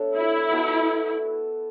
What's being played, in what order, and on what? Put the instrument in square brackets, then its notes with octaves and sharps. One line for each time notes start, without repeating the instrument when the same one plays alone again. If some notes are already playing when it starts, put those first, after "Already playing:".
Already playing: [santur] A3 B3 D4 A4 C#5
[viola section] E4
[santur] B3 F#4 A4 D5